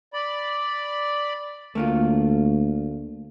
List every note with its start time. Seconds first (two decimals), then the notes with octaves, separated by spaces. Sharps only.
0.14 D5 B5
1.75 D2 A3 A#3 F4